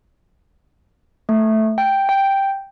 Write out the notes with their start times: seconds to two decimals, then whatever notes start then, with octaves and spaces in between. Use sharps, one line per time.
1.29 A3
1.78 G5
2.09 G5